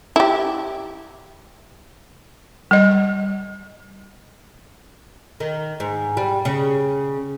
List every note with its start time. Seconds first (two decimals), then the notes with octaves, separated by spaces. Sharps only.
0.16 E4 G4
2.71 G3 D#5
5.40 D#3
5.80 G#2
6.17 G3
6.45 C#3